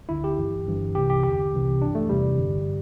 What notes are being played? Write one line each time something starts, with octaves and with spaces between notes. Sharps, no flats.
D2 D3 E4
G4
G1 G2 E3
G1 G2 E3
C2 C3 E3 G4
G4
E2 D3 G4
C2 C3 E3
A1 G2 E3 D4
A3
E2 C3 E3 G3
G1 G2 D3